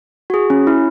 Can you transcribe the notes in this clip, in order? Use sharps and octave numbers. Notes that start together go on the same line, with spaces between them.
F#4
G#4
C#4
E4